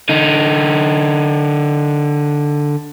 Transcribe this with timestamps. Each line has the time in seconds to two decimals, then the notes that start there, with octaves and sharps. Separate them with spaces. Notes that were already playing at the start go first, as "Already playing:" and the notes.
0.09 D3 D#4